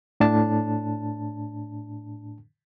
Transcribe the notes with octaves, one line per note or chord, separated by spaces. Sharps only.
A2 D4 A5